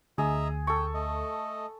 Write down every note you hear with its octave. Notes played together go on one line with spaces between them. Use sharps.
D2 G#4 D#5 E5 A#5
A4 G5 C#6
A3 D#5